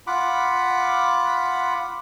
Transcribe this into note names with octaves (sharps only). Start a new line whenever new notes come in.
F4 F#5 B5 D6